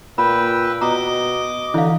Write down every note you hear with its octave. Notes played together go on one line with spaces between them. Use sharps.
A#2 B4 G5 B5 E6
B2 D#5 A#5 D6
D3 E3 E4 F5